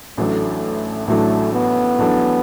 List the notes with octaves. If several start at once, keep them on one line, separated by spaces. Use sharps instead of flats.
A1 A2 F#3 A3 D4 A4
A1 A2 F#3 A3 D4 A4
B3
A1 A2 F#3 D4 A4